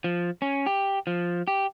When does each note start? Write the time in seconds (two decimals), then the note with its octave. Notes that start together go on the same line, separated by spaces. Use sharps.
0.04 F3
0.42 C#4
0.66 G4
1.07 F3
1.48 G4